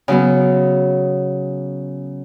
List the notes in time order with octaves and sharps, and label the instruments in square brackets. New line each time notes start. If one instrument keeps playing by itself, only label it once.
[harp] C#3 F#3 B3